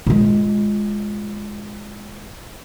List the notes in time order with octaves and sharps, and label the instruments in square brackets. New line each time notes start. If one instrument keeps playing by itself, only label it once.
[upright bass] A#2 G#3